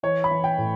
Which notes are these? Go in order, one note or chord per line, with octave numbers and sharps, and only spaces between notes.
E3 C#5
B5
E3
G5
A2